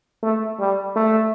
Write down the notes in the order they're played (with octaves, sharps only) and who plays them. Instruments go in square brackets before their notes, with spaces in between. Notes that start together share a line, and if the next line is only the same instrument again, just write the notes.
[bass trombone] A3
G3
A3